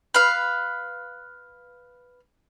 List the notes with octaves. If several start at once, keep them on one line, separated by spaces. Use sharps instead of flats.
B4 F5